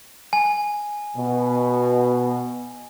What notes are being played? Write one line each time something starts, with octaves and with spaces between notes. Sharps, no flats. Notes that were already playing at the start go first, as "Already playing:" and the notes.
G#5
B2